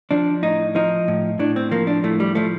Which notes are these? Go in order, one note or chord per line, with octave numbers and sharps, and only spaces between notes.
F3 D4
A2 D#4
F3 D#4
A2
A2 D4
C4
F3 A#3
D4
A2 A3
G3
F3 A3